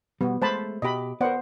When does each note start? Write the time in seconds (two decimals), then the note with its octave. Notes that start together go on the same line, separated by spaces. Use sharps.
0.21 B2 G3 B3
0.42 G#3 A3 C5 A5 B5
0.82 B2 G4 D#5 B5
1.21 B3 A#4 C5 D5 F#5